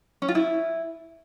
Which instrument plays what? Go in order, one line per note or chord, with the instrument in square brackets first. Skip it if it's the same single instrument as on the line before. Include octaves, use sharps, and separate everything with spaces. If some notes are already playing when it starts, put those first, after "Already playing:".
[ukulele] C#4
F4
E4